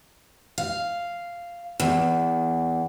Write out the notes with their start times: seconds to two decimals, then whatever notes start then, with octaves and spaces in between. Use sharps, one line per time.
0.58 F5
1.80 E2